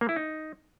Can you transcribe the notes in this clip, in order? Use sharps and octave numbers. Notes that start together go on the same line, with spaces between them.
A#3
E4
D#4